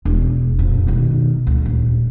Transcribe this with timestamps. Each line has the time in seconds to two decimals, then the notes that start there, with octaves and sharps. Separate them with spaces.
0.05 E1
0.59 D#1 F2
0.87 B2 D#3
1.47 D2 B2
1.66 D#1